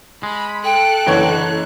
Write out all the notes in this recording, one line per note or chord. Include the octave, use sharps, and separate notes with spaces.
G#3 B5
A4 G5 F#6
F#1 D3 E3 C#5